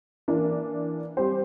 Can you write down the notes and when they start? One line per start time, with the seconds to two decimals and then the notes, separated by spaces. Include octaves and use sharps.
0.28 E3 A#3 D4
1.17 G3 C4 G4 C5